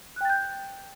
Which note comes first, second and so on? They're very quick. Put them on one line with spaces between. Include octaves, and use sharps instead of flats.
F#6 G5 A6 G6